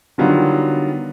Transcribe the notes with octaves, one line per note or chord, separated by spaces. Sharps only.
D3 D#3 F#3 G3 B3 F4